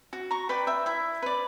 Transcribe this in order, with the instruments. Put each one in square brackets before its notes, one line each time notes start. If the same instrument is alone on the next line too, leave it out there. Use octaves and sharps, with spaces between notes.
[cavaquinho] F#4
A#5 C#6
B4 D5 G5 B5
E5 G5
E4 E5
B4 D5